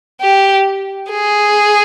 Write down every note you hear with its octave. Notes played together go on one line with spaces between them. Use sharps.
G4
G#4